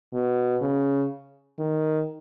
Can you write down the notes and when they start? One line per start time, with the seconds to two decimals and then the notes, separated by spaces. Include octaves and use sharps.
0.13 B2
0.62 C#3
1.59 D#3